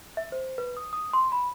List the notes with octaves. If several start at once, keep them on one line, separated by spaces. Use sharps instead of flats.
E5
C5
B4
D#6
D#6
C6
B5